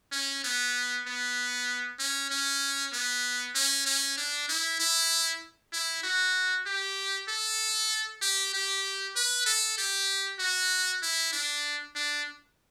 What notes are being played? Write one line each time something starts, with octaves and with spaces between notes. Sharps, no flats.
C#4
B3
B3
C#4
C#4
B3
C#4
C#4
D4
E4
E4
E4
F#4
G4
A4
G4
G4
B4
A4
G4
F#4
E4
D4
D4